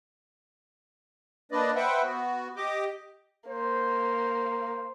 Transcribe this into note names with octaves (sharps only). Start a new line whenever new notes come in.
A#3 D4 B4 D5 D#5
B4 C5 E5 F#5 G5
B3 F#4
G4 D#5 D6
A#3 C5